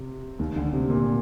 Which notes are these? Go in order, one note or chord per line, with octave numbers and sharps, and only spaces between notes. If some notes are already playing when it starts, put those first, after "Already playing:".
Already playing: C3
D#2 D#3
D2 D3
C3
A#2